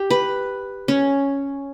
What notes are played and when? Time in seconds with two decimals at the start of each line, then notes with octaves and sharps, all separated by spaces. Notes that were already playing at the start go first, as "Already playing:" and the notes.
Already playing: G4
0.10 B4
0.88 C#4